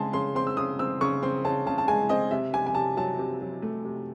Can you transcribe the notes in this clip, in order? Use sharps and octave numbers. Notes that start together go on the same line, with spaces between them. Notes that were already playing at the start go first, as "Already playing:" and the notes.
Already playing: C#3 G#3 C4 G#5 A5 C6
C#3 C6
C4 C6
E6
C#3 D#6
C4 E6
C#3 C#6
C4 C6
C#3 A5
C#3 A5
A5
G#3 G#5
C4 D#5
C3 E5
C3 G#5
G#5
C3 A5
F#3 A5
C3
F#3
A3
C3